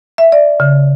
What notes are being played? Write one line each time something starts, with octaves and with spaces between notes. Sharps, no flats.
E5
D5
C#3